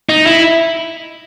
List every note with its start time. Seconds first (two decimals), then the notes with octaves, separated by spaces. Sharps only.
0.09 D#4
0.26 E4